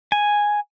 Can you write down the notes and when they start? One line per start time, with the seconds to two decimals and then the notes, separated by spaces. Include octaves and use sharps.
0.12 G#5